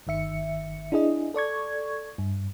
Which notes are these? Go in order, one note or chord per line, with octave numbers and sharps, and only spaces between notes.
G1 D#3 E5 C#7
D4 E4 G#4 D#5
A4 D5 C#6 G#6
G2